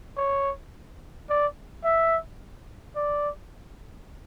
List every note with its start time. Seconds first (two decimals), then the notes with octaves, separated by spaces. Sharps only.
0.17 C#5
1.29 D5
1.84 E5
2.96 D5